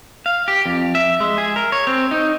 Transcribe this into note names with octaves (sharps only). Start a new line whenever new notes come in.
F5
G4
F2
E5
G#3
G#4
A#4
C#5
C4
D#4